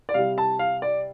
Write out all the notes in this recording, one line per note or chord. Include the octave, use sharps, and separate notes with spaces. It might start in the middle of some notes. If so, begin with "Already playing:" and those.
D5
C3 G3 F5
A5
F5
D5